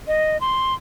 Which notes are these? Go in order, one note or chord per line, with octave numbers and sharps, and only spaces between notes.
D#5
C6